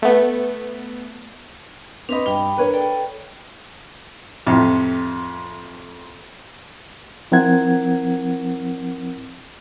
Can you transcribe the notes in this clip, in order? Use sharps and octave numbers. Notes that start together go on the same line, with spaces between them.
A3 B3
C4 D4 B4 D#5 B5
G2 D4 G5 B5 G7
A#4 B4 C#5
A4 D5 G5
F2 A2 C3
F3 C4 E4 A#4 F#5 G#6